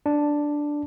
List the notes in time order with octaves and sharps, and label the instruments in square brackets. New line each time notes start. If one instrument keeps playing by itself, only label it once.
[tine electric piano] D4